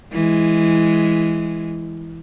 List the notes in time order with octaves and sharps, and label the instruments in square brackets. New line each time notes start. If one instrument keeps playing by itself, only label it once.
[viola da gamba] E3 G#3